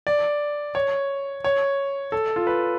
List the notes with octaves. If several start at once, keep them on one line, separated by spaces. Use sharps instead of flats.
D5
C#5
C#5
A4
F4
B4